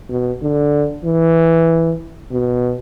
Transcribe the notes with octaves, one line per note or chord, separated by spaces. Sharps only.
B2
D3
E3
B2